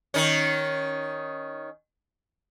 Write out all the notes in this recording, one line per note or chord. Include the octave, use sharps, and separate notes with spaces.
D#3 C#4